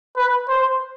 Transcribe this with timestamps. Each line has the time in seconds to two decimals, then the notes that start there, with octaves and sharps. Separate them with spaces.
0.17 B4
0.48 C5